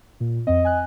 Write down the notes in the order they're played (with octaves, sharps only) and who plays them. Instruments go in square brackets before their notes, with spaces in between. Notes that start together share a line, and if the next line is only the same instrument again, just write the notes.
[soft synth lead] A#2
[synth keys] F2 C4 [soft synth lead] D#5
[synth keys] G#5 F#6